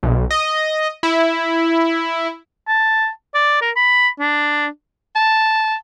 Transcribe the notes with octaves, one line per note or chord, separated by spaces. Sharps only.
B1
D#5
E4
A5
D5
A#4
B5
D4
A5